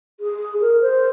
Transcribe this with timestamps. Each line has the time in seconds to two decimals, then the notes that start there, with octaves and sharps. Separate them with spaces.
0.20 G#4
0.61 A#4
0.81 C5